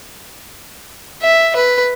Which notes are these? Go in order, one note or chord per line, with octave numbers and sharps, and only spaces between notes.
E5
B4